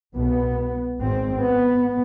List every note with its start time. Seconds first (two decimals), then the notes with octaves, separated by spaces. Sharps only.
0.16 C2 B2 B3
1.01 G#1 G#2 C4
1.43 B3